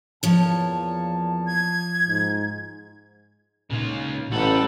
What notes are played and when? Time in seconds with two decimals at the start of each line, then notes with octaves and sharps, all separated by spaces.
0.23 E2 A#2 F3 C#5 A5
1.47 G#6
2.06 G#2
3.70 A#2 C#3 D#4 F4
4.32 A1 G3 C#4 A4 C#5 F#5 B5